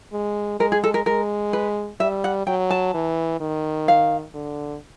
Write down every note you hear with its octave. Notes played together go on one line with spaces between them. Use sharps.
G#3
G#3 A#4
G#4
A4
A#4
G#3 A#4
B4
G3 E5
F#5
F#3 G5
A5
E3
D#3
F5
D3